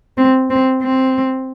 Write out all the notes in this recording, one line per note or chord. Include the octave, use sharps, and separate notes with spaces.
C4
C4
C4